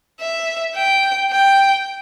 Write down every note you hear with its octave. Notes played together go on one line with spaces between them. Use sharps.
E5
G5
G5